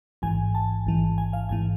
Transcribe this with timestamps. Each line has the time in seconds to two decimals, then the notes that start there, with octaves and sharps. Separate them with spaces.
0.22 A1 G#2 E3 G#5
0.55 A5
0.86 A1 G#2 E3
1.18 G#5
1.33 F5
1.49 A1 G#2 E3 G#5